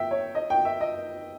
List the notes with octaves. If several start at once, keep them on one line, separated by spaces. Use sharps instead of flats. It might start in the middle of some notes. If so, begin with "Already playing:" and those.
Already playing: E5 G5
C#5
D#5
G5
E5
D#5